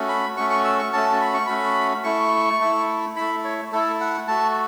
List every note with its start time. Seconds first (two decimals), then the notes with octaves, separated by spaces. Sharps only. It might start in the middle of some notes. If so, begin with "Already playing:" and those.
Already playing: A3 C#4 F#4
0.09 B5
0.37 A3 C#4 F#4 C#6
0.50 C#6
0.65 E6
0.79 C#6
0.93 A3 C#4 F#4 A5
1.21 B5
1.34 C#6
1.46 A3 C#4 F#4 B5
2.04 A3 E4 C#6
2.61 A3 E4
3.16 A3 E4 B5
3.44 C#5
3.72 A3 E4 A4
4.00 F#5
4.28 A3 F#4 A5